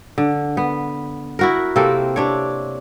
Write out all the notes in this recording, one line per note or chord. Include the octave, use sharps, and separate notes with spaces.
D3
B3
E4 F#4 A#4
C3 A#3 C4 A4
C3 D4 C#5